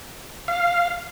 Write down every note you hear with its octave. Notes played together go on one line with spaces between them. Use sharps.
F5